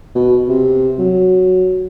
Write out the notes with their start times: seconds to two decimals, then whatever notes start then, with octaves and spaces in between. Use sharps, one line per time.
0.15 B2
0.48 C3
0.98 F#3